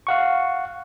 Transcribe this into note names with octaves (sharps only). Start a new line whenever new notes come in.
F5 F#5 C#6